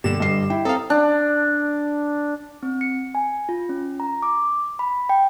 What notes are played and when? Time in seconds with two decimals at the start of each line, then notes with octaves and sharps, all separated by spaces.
0.04 G2 B2 D3 A#3 G4 E7
0.20 G2 D#5 C7
0.50 E4 G5
0.65 C4 A4 C5 F5 A#5 D#6
0.90 D4
2.63 C4
2.81 C#7
3.15 G#5
3.49 F4
3.69 C#4
4.00 A#5
4.23 D6
4.79 B5
5.09 G5